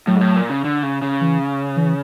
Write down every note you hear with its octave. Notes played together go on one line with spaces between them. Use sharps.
A2 F#3
G#2
A2
A#2
C#3
D3
C#3
C#3
E3
E3